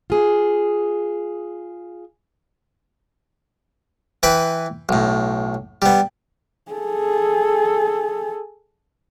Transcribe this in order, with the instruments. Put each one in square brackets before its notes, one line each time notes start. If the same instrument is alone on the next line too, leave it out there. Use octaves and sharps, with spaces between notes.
[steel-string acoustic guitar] F4 G#4
[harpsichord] E3 B4 G5 B5 C6
B1 A2
G3 B3
[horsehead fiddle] G#4 A4